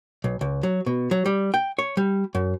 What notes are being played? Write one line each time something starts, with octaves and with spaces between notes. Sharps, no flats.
B1
C#2
F#3
B2
F#3
G3
G5
C#5
G3
F#2